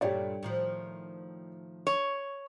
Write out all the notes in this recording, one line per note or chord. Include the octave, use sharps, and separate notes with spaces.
G2 A#2 A3 G4 C#5 D5
A2 D#3 F3
C#5